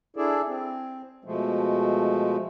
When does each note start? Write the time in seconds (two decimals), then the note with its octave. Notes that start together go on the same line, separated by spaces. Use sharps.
0.17 D4 E4 G#4 A4 D5
0.47 C4
1.25 B2 F3 G#3 A3